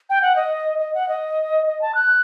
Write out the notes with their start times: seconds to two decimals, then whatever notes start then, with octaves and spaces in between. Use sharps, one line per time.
0.10 G5
0.22 F#5
0.36 D#5
0.79 D#5
0.94 F#5
1.09 D#5
1.66 D#5
1.81 A5
1.95 F#6